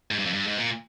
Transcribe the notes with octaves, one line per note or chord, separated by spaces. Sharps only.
G#2
G2
F2
G2
G#2
A#2